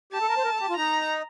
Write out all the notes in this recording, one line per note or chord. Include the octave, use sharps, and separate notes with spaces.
G4 A5
A4
A#4
C5
A#4
A4
G4
F4
D#4 A#5